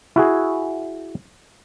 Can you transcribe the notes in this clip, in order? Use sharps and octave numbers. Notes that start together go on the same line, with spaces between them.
E4 F#4 G#4